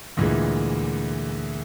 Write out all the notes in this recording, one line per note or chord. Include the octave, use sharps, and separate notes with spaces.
D2 A#2 E3 G#3